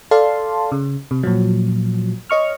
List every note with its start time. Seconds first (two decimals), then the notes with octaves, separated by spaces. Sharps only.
0.11 A4 D5 F5 A5 C6
0.72 C#3
1.11 C3
1.23 A#2 F3 F#3
2.30 C#5 D#5 C#6 F6